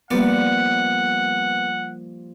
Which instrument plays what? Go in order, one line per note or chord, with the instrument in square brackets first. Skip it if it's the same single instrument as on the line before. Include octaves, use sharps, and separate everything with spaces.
[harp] F3 G3 A#3 [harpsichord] B3 D5 [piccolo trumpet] F#5